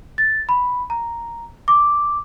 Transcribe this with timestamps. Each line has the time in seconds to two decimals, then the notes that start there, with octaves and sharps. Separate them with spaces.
0.18 A6
0.49 B5
0.90 A#5
1.68 D6